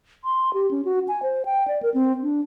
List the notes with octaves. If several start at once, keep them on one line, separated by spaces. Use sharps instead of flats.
C6
G4
C#4
F#4
G#5
C5
G5
D5
A#4
C4
D4